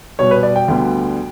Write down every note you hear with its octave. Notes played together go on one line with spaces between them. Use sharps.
B2 G3 B3 C#5
B4
D5
G5
D2 D3 G3 B3